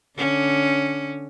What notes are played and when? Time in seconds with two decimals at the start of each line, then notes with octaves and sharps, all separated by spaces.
0.17 D3 C#4